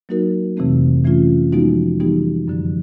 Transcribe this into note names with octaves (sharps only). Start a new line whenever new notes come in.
F#3 A#3 D#4 F#4 A#4
F2 C3 E3 A3 C4
E3 A3 C#4 F4
F3 G#3 B3 D#4 F#4
E3 G3 B3 D#4 G4
F#2 D3 F3